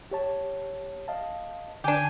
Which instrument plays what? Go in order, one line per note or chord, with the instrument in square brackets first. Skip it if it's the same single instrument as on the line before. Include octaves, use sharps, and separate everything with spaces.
[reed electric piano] G4 C#5 A5
D#5 F5 A5
[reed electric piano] D3 [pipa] D4 G4 [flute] G#5